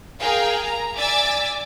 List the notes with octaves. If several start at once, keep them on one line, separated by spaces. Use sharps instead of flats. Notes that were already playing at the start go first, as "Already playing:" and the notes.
G#4 A#4 F5 G5
A#5
D5 E5 G#5 D6 E6 A6